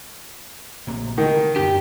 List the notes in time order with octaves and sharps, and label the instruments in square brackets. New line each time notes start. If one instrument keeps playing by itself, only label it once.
[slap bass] A#1 C3 A#3
[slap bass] D3 [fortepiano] D#3
[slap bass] F#2 D4 [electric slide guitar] G4